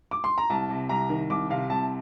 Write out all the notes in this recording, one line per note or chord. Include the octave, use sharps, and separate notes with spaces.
D6
C6
A#5
C2 A5
C3
C2 A#5
D#3
C2 D6
C3 F5
C2 A5